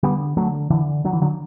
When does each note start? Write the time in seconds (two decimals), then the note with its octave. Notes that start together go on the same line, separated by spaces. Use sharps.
0.03 D3 G3 B3
0.37 D3 F#3 A3
0.70 D3 E3
1.05 D3 F#3
1.13 E3
1.22 D3 F#3